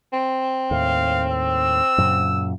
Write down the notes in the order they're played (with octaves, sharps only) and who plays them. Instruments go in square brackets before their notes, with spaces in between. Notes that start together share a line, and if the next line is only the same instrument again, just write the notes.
[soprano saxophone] C4
[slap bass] D#2 A2 [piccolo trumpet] F5
[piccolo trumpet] E6
[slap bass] F#2 A#2 C#3